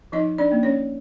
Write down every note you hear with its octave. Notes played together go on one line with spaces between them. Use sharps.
F3 D#4 D#5
D4 D5
A#3 C#4
C#4 C#5